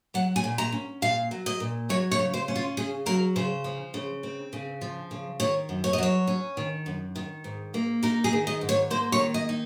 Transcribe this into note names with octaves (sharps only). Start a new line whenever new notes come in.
F#3 F#5
G#5
A#2
A#5
C#4
A#2 F5
F#3
D#5
A#2
F#3 C#5
C#5
C#3
C5
C#4
F4
C#3 G#4
F#3 A#4
C#3 C5
F3
C#3
C4
C#3
F3
C#3
D#3 C#5
F#2
C#5
D#5
F#3 C#5
C#4
D#3
F#2
D#3
G#2
A#3
D#4 A#4
G#4
D#3
D#5
G#2
C#5
A#3 C5
C#5
D#3
D#5
D#4